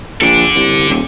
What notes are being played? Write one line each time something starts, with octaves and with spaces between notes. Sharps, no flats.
A#1 A4 D5
C2
D#1